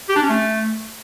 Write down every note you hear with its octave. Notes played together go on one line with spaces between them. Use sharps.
G4
D4
C#4
A3